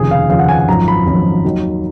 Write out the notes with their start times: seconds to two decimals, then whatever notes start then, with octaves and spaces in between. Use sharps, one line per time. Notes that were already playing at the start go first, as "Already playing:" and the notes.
Already playing: F1 D#2 C#3 F3 G#4
0.11 F5
0.30 F1 D#2 C#3 F3 F5
0.39 F#5
0.49 G#5
0.59 G#5
0.68 G#1 F#2 F3 A#5
0.88 B5
1.06 G#1 F#2 F3
1.44 D#2 D#3 F#3